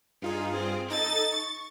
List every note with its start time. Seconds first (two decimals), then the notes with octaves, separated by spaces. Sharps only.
0.22 G2 D#4 F4 G#4
0.53 C4
0.90 D#4 A4 D#5 A6
1.32 C#6